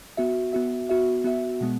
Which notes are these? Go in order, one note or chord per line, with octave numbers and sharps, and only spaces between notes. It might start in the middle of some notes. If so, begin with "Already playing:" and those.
B3 F#4 E5
B3 F#4 E5
B3 F#4 E5
B3 F#4 E5
B2 G#3 B3